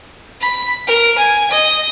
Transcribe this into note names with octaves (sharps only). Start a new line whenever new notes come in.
B5
A#4
G#5
D#5